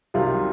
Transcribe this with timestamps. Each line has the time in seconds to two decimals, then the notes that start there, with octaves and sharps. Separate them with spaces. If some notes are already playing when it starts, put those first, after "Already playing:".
0.14 C2 C3 D#3 F#3 F4